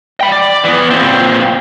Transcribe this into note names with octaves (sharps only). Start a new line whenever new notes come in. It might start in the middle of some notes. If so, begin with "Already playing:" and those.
G5 B5
D5
E3 B3
A#2 C4